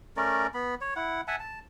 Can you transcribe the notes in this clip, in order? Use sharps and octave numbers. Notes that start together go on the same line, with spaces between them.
A3 C#4 A#4 D5
B3 B5
C#5
E4 F#5
E5 F#5 G#5 A5
A5